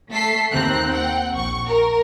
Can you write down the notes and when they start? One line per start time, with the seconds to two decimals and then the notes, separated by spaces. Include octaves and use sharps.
0.10 A3 A4 B6 C7
0.52 D#2 C4 A#5 F#6
0.91 F#5 G5
1.34 A#1 C#6
1.67 A#4